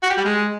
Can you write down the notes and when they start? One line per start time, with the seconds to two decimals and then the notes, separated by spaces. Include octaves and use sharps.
0.03 F#4
0.10 G4
0.17 G3
0.25 G#3